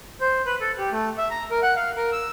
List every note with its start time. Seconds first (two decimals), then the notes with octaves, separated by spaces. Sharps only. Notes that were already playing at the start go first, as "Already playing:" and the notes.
0.21 C5
0.46 B4
0.61 A4
0.78 G4
0.92 A3
1.18 E5
1.31 A#5
1.51 A#4
1.63 F#5
1.76 F5
1.97 A#4
2.12 E6